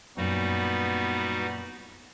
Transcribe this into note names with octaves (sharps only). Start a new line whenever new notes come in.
F#2 A#2 G3 B3 D#4 F#4